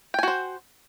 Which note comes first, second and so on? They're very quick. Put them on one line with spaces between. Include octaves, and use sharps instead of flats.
G5 G#5 F#4 C5